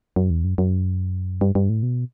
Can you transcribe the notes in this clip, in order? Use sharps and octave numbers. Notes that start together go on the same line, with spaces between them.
F#2
E2
F#2
F#2
G2
G2
A2
B2